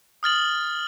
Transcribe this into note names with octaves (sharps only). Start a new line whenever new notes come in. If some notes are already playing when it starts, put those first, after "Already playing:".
D#6 F6 A6 F#7